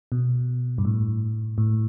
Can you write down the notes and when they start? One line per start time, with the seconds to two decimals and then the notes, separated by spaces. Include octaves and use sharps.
0.12 B2
0.78 G2
0.85 A2
1.58 A2